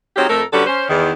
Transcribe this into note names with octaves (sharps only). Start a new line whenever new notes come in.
F#3 C4 D#4 F4 G4 G#4
F2 A3 A4 A#4
D3 G3 C#4 F#4 A4 B4
C#4 C5
E2 D#3